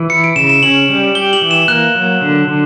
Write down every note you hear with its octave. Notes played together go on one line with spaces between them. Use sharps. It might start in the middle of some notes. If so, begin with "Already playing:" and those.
Already playing: E3
E4 C#7
D7
C#3 E7
E7
C#4 F#7
G3
G4 G7
F#7
E3
E7
A#3 F#6
F#3
D3
D3